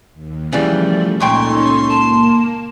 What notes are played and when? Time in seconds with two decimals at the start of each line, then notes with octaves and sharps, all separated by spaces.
0.14 D#2
0.53 C#3 E3 F3 G3 A3 D5
1.20 C#2 A#2 C#4 D#4 A4 G5 C6 C#6
1.89 A#3 A5